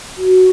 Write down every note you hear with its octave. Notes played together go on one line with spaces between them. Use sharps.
F#4